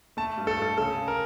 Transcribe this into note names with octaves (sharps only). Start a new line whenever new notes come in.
A3 A5
G2
A4
G2 A4
C#3 A4
C#3
A#4